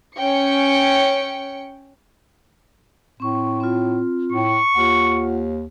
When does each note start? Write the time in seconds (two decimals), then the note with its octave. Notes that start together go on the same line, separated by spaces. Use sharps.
0.16 C#4 G5 C#7
3.20 A2 C4 C#6
3.60 C4 F4
4.32 A2 C#6
4.75 D#2 F4 F#5